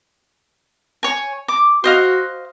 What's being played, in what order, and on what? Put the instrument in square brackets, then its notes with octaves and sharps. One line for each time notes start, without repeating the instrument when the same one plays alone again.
[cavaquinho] C#5 G#5
D6
[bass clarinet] F#4 [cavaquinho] C5 D#5 F5